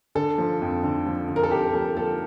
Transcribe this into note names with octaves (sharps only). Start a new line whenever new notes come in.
D3 A4
F3
F2
D3
F3
D3
A#4
A4
F2 G4
F3 A4
F3 A4